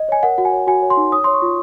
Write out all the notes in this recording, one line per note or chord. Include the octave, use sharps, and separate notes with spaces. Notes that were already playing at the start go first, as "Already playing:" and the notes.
Already playing: D#5
C#5 G#5
A#4 F#5
F#4 F#5
G#5
C#5
F#4 G#5
C#5
C6
D#4
C#5 D#6
C#5 C6
C#6
F4